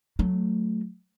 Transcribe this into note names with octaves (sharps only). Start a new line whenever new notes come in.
F#3 A3